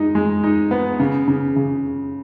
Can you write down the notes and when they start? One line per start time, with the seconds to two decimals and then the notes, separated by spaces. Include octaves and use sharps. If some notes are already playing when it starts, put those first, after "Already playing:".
Already playing: G#3 D#4
0.15 G#3
0.44 D#4
0.71 B3
1.00 C#3
1.28 C#3
1.56 C#3